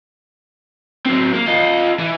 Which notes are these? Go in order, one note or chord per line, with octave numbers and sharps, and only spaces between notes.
F#3 C4
A#3
F4 D#5
E3